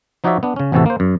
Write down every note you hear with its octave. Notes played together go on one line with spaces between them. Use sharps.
F3 D#4 F#4 C#5 D5 E5
B3 D4
C#3 C#4
A1 E2 C3 E3 F#4 A4
A#3 C5
F#2